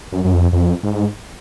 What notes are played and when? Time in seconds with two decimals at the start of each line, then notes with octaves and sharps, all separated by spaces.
0.12 F#2
0.25 F#2
0.33 F2
0.53 F2
0.83 G#2